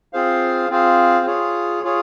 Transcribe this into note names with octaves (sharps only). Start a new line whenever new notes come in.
C4 F4 G#4 C5 F5
C4 F4 G#4 C5 F5
F4 G#4 C#5
F4 G#4 C#5